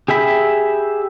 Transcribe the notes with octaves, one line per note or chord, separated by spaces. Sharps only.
G4 G#4 E5 B5